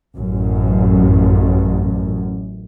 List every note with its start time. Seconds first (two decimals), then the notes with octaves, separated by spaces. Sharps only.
0.15 A1 F#2